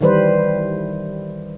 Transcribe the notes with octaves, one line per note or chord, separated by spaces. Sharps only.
D#3 E3 G3 B4 C5